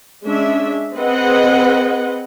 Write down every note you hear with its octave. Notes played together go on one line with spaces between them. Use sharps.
G#3 C#4 D4 E5
C4 G#4 B4 D#5 F#5